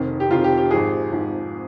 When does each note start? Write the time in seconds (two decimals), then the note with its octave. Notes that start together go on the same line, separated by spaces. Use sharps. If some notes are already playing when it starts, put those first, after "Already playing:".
Already playing: F1 F2 D#3
0.20 G4
0.30 F1 F2 D#3 F4
0.44 G4
0.57 G4
0.71 G#1 G#2 F3 G#4
1.12 G#1 G#2 F3